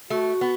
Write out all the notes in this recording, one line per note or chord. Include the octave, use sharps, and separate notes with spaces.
A3 F#4
B3